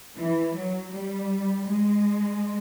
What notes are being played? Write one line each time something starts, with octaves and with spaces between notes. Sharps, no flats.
E3
F#3
G3
G#3